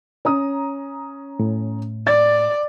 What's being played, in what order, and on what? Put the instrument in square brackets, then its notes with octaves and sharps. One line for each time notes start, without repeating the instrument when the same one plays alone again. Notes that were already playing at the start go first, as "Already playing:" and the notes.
[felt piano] C#4 A#5 D#6
[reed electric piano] A2
[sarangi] D5 [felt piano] A6